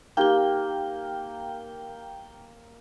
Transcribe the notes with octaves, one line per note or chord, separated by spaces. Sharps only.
A#3 D#4 G4 G5 G7